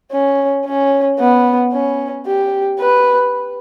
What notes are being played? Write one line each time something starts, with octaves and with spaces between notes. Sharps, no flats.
C#4
C#4
B3
C#4
G4
B4